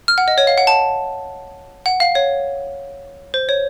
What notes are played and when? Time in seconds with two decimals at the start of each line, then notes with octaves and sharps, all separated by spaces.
0.08 F6
0.18 F#5
0.28 D#5
0.38 C#5
0.47 F5
0.58 F#5
0.67 A5
1.86 F#5
2.00 F5
2.15 C#5
3.34 C5
3.49 C#5